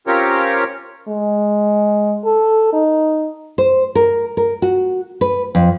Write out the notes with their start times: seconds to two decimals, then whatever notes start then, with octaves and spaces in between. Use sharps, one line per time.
0.07 C4 C#4 F4 G4 A#4 C#5
1.08 G#3
2.25 A4
2.73 D#4
3.58 C5
3.95 A#4
4.37 A#4
4.62 F#4
5.21 B4
5.55 F2